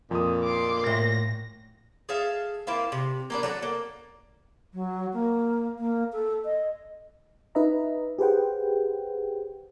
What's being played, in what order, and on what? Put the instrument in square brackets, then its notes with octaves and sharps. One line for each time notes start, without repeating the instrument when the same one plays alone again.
[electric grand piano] F2 D#6 [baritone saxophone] A#2
[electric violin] C6 D6
[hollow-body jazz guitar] A2 [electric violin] A#6
[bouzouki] G#4 A4 E5 F5
A#3 C4 E4 F4
C3
A#3 B3 D4
F#3 A4 F#5
A#3
[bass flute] F#3
A#3
A#3
A4
D#5
[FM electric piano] D#4 B4 D#5 E5 A#5
G4 G#4 B4 C5 F#5 G5